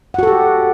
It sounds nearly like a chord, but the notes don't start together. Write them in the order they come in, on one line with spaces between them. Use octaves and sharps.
F#5 F#4 A4 G4